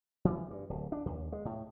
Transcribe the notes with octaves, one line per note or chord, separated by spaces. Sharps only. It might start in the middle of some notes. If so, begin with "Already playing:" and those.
E3
G2
D1
D4
D#2
G#3
A2